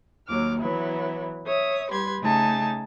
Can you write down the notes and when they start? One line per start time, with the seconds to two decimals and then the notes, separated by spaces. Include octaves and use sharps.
0.28 D#2 F#3 D6 F6
0.60 E3 F#3 B3 E4
1.45 C#5 E5 D#6
1.90 G3 G4 B4 C6 G#6
2.21 C#3 A3 D#4 G#5 A5